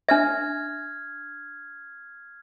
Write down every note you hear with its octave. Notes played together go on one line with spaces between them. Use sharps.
D4 E5 F6 G#6